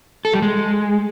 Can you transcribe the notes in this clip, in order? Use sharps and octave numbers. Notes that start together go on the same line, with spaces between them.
A4
G3
G#3